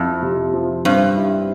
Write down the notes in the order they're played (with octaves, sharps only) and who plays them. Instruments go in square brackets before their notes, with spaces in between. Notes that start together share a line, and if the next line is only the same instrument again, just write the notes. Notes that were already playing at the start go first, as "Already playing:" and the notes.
Already playing: [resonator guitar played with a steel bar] F2 [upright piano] C4 E4
[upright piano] C3
F3
[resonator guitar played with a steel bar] G2 [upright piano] C4
[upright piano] E4